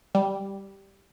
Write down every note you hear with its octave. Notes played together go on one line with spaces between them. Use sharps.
G3